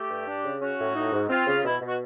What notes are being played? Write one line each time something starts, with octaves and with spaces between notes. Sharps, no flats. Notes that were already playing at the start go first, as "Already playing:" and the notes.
Already playing: A3 G4
G2
D4
C#3
C#4 F#4
A2
D#4
G#2
C4 F4
C#3
B2 E4
B2
F#4